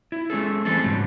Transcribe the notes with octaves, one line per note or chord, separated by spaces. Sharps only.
E4
G#3 C#4 G#4 A4
E3 G3 A3 C4 G#4 A4
G#2 C#3 F#3 G3